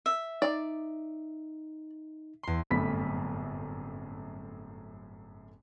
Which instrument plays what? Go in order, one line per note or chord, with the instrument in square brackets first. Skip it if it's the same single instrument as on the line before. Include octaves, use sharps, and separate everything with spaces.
[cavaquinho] E5
[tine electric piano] D#4 [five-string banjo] D5
[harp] E2 C6
[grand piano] D1 G1 F#2 A3 B5 B6